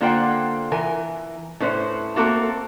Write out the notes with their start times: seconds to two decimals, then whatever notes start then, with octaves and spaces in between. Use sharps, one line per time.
0.01 D3 A#3 F4 C5 F#5 G5
0.72 E3 A#4 G#5
1.60 A2 C#4 B4 C5
2.16 A3 A#3 C4 F#4 A4 A#4